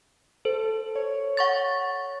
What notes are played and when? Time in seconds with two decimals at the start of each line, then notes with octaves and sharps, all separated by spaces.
0.45 A4 C5
0.96 C#5
1.37 F#5 C#6 A6